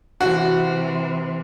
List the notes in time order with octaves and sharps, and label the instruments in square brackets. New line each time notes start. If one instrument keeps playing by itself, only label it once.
[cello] C3 E3 [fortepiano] F#4